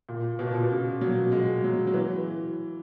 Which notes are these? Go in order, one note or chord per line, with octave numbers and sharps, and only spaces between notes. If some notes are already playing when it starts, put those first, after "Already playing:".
A#2
B2
A#2
B2
C#3
F#3
G#3
F#3
F#3
E3